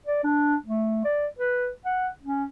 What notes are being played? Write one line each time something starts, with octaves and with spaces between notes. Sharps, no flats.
D5
D4
A3
D5
B4
F#5
C#4